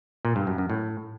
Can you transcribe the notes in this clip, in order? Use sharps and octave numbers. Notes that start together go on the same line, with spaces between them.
A#2
G2
F#2
F#2
A2